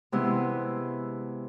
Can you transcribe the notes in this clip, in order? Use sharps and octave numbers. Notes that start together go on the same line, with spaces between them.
C3 E3 G#3 B3 E4